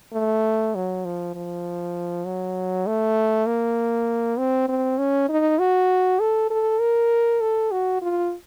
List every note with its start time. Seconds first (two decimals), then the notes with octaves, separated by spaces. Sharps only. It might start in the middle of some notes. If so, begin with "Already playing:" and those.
0.14 A3
0.75 F#3
1.05 F3
1.35 F3
2.26 F#3
2.87 A3
3.47 A#3
4.38 C4
4.69 C4
4.98 C#4
5.29 D#4
5.59 F#4
6.20 A4
6.50 A4
6.81 A#4
7.41 A4
7.71 F#4
8.02 F4